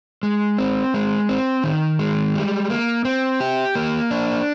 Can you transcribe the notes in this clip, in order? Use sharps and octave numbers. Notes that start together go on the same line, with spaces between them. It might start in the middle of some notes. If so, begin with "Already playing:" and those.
G#3
C4
G#3
C4
D#3
G#3
G3
A#3
C4
G4
A#3
D4